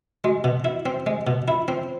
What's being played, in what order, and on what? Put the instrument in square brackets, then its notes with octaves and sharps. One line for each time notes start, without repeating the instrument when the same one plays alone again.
[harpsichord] G#3 [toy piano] F#4
[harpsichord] B2
E4
C4
G#3
B2
[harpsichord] E4 [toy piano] F4
[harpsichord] C4